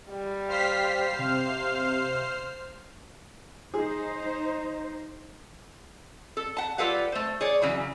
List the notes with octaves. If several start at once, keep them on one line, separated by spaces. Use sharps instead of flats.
G3
C5 F5 F6 B6 C7
C3 F5
D#4 G#4 C5
A4
F#5 A5
G3 F4 A4 B4 F5 F#5
A3 C5
G#4 C#5 D5
C#3 E3 F#3